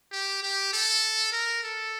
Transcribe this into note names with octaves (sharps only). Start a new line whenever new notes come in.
G4
G4
A4
A#4
A4